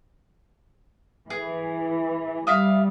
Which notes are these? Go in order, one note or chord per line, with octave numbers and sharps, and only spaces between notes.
E3 G#4
G3 E5 F5 D#6